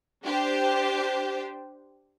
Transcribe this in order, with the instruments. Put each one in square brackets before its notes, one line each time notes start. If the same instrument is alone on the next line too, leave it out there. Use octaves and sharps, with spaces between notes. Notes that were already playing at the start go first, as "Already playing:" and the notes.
[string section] D4 G4 C5